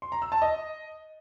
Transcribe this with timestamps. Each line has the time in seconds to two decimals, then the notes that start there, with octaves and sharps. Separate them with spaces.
0.02 C6
0.12 A#5
0.22 E6
0.32 A5
0.42 D#5